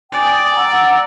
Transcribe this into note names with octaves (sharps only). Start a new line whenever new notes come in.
D5 G5 G#5 D#6
F#5 A#5 E6